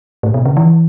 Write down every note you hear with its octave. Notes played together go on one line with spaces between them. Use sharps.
A2
B2
C#3
E3